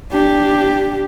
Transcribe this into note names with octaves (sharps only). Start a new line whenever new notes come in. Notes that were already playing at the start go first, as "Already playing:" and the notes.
D4 G4